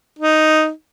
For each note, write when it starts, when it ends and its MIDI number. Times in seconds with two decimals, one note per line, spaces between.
0.19 0.69 63